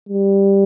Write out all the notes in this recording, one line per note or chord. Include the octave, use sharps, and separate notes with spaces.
G3